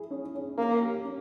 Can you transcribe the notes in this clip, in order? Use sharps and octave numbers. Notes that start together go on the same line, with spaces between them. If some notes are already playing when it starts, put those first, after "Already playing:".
Already playing: E4 G#4
C#4
C#4
A#3 C#4
G4
C#4